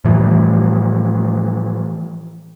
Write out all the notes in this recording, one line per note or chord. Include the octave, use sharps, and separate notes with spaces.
A2 E3 F3 G3